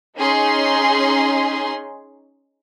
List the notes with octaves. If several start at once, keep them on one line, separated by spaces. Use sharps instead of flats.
C#4 D#4 G#4 C6